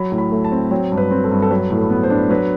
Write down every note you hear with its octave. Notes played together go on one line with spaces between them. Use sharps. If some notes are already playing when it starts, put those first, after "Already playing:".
Already playing: F#3 B5
A2
B5
A3
A5
C4
F#3 G5
G2
B4
C4
A4
G2
A4
F#3 B4
A2
A4
B3
C5
D4
F#3 B4